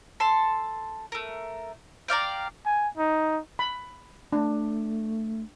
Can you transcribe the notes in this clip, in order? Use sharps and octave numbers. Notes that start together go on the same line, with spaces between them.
A4 A5 C6
A3 A#4
A#4 D5 F5 G5
G#5
D#4
B5
A3 D4